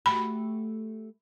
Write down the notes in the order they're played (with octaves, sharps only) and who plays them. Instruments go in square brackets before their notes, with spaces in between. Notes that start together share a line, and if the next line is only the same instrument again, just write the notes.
[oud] A3 F#4 G4 [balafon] B5